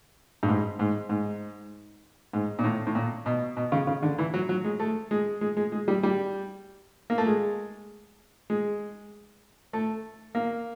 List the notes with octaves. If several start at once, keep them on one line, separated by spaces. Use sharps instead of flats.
G2
G#2
G#2
G#2
G#2
A#2
A2
A2
A#2
B2
B2
C#3
C#3
D3
E3
F#3
F#3
G#3
A3
G#3
G#3
G#3
G#3
G3
G3
A#3
A3
G#3
G#3
A3
A#3